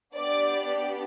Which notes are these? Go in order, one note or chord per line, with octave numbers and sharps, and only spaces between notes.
B3 D4 G4 D5